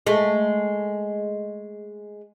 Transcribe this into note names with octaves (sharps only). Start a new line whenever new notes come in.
G#3 A3